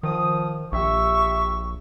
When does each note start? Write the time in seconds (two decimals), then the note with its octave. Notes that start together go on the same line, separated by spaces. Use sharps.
0.03 D#3 F3 D#6
0.72 A#1 G4 E5 C#6